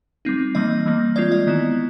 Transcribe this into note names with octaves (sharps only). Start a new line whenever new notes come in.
G3 C4 D#4
E3 G3 A#3 D#5
E3 G3 A#3
G#3 C4 F4 D5
D#5
D#3 G#3 B3 E4